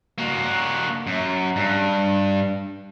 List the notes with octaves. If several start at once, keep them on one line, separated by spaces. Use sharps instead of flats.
A#3 F#4
F#2
G2